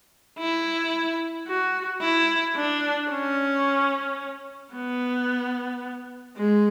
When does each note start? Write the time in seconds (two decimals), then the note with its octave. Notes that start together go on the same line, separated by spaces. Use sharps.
0.38 E4
1.47 F#4
2.01 E4
2.56 D4
3.10 C#4
4.73 B3
6.36 G#3